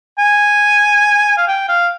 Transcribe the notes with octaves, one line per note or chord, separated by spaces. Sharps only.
G#5
F5
G5
F5